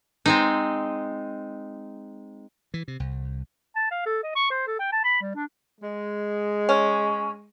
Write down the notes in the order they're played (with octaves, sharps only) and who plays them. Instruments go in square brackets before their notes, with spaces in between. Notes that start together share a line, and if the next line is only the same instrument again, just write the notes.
[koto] G#3 C4 D#4
[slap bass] E3
C3
C2
[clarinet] A5
F5
A4
D#5
C#6
C5
A4
G5
A5
B5
G3
D4
[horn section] G#3
[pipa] C#4